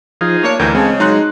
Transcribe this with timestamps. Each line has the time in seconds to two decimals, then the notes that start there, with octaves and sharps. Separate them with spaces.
0.21 F3 D#4 F4 G#4
0.44 A#3 D4 C#5
0.59 D2 E3 G3 A3 A#4 G5 G#5
0.75 C#3 G#3 C4 C#4 A5
1.00 F#3 D#4 C6 F#6